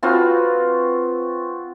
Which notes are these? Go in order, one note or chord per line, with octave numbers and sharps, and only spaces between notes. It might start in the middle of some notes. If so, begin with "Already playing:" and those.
C4 F4 F#4 B4